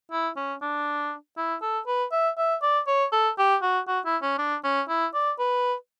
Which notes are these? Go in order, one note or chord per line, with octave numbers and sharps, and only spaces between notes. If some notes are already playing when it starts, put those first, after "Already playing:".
E4
C#4
D4
E4
A4
B4
E5
E5
D5
C#5
A4
G4
F#4
F#4
E4
C#4
D4
C#4
E4
D5
B4